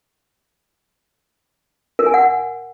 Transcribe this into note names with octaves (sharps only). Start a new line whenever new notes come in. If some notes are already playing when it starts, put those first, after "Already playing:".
A#4
G#5
F#5